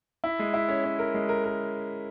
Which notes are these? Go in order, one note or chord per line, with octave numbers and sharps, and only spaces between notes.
E4
G#3
E4
C#4
C#4
A#4
G#3
A#4
A#4